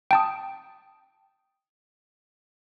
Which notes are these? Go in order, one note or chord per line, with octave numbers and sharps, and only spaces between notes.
G5 A5 D#6